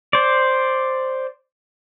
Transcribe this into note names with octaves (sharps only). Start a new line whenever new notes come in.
C5 D5